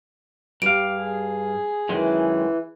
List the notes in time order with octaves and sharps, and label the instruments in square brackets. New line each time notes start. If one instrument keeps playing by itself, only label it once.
[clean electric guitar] G2 F5 [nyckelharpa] G4 [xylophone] D7
[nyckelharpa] G#4
[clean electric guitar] F#2 D#3 G#3 [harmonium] E3